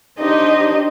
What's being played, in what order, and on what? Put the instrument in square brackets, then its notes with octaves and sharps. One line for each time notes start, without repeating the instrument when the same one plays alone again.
[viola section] D4 G4 C5 D#5 [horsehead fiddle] D#4